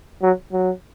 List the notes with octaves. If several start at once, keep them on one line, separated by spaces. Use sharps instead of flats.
F#3
F#3